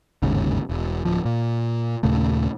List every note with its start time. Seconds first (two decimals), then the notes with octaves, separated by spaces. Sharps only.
0.22 G1 D#2 G#2 C#3
0.70 E1
1.05 D1 F3
1.25 A#2
2.03 D#2 A#2 C#3 A3